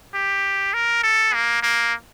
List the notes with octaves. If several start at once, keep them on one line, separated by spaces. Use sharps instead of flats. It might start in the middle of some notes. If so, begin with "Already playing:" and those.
G4
A#4
A4
A#3
A#3